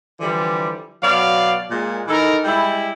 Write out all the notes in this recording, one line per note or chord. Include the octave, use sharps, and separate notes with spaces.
D3 E3 F3 G3
B2 F#3 D5 F5
A#2 G#3
E3 D#4 A4 A#4
G3 G#3 E4